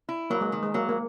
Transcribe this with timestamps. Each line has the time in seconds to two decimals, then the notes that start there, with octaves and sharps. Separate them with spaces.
0.09 E4
0.30 F#3 A#3
0.41 G#3
0.52 D#3
0.63 G#3
0.74 F#3 A#3
0.89 A#3